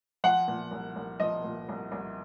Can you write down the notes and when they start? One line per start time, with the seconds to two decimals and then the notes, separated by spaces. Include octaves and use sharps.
0.24 F3 F#5
0.48 A#2
0.71 C2
0.96 C2
1.20 F3 D#5
1.44 A#2
1.69 C2
1.92 C2